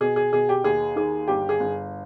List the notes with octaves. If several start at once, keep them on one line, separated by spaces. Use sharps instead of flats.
B2 G#4
G#4
B2 G#4
G4
D#2 G#4
D#3 G#4
G1 G4
G#4
G1